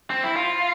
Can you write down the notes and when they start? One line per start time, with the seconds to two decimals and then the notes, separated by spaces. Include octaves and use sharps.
0.10 C4
0.24 E4
0.36 F4